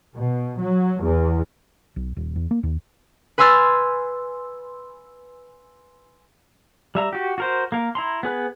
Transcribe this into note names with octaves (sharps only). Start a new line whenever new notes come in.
B2
F#3
E2
B1
D#1
E2
A#3
D#2
B4 G#5 C6 E6 F6 A6
G3 E5 A#5
F#4 G4
F#4 A#4 C5
A#3 A#4
E4 A#5 C6
B3 G#4 B4